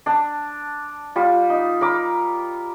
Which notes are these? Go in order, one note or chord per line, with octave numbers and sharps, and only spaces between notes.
D4 A5
G3 F4
D#4
A#4 B5 D6